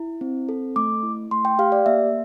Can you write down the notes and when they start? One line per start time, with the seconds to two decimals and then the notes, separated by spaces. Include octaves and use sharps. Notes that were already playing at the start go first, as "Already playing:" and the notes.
Already playing: E4
0.21 C4
0.49 A4
0.76 A3 D6
1.03 E4
1.31 A3 C6
1.45 G5
1.59 G4 F5
1.72 D5
1.86 A#3 E5